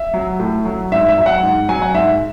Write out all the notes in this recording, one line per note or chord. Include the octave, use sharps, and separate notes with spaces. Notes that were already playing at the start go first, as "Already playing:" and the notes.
Already playing: E5
F#3
A2
F#3
G#2 E5
E5
F#3
F#5
G#2
F#3 G#5
F#5
G#2 E5